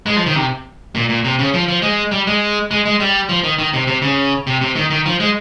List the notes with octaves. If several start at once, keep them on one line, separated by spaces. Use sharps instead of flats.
G#3
F3
D#3
C3
A#2
A#2
C3
C#3
F3
F3
G#3
G3
G#3
G#3
G#3
G3
F3
D#3
D#3
C3
C3
C#3
C3
C3
D#3
D#3
F3
G#3